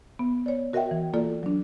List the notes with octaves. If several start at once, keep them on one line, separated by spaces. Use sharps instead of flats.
B3
C#5 D5
F#4 A#4 D#5 E5 F#5 G5
E3
A#3 F4 A4 D5
F#3 D4